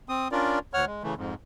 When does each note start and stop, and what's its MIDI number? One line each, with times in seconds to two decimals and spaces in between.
0.09 0.28 60
0.09 0.28 87
0.32 0.59 61
0.32 0.59 62
0.32 0.59 65
0.32 0.59 70
0.32 0.59 74
0.74 0.85 38
0.74 0.85 73
0.74 0.85 78
0.74 0.85 89
0.86 1.03 56
1.03 1.14 49
1.03 1.14 52
1.03 1.14 57
1.17 1.34 41
1.17 1.34 44